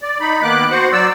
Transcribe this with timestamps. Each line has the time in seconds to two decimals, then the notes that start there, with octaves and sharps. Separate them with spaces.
0.02 D5
0.20 D#4 B5
0.43 D#3 A#3 B3 D6 F#6
0.71 F#4 C5 F#5
0.93 F#3 D5 E6